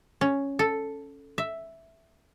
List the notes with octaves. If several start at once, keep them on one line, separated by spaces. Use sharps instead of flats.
C#4
A4
E5